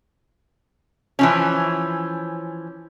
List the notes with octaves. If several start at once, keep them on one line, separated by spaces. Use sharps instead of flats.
E3 F3 C#4